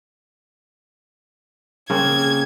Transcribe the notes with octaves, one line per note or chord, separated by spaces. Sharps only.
C#3 A#3 C4 G#6